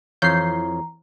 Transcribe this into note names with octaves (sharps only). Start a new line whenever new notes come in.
F2 E3 C#5 F5 A#5 G6 C7